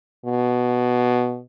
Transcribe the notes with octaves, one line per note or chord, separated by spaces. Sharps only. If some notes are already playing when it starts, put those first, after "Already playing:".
B2